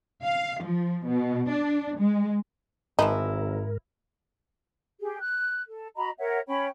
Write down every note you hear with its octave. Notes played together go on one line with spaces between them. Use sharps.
F5
F3
B2
D4
G#3
G#1 G#2 E3 F3 D#4 E4 A#4
G4 G#4
F#6
A4
F#4 D#5 A#5 B5
A#4 C#5 E5 F#5
C#4 C#5 G5 B5